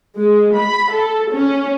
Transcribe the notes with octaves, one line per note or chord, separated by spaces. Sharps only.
G#3
B5
A4
C#4